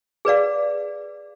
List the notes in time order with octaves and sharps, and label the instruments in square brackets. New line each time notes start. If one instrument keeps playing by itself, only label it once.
[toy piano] G#4 B4 D5 F5